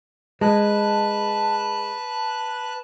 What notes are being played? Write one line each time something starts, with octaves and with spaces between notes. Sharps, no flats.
G#3 B4 A5 F#6